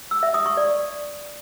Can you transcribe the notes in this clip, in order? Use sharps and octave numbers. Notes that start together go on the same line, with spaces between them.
E6
E5
D#6
C#6
D5